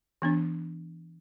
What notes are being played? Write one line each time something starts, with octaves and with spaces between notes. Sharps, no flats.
E3 B3 D4